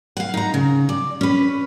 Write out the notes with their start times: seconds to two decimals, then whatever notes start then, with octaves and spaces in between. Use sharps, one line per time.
0.17 F5 F#5
0.34 D#4 A#5
0.54 C#3
0.89 D5
1.21 C#4 B4